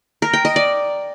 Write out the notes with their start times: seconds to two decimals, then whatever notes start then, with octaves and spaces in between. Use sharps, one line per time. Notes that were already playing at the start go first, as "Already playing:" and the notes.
0.22 A#4
0.33 G5
0.45 D#5
0.56 D5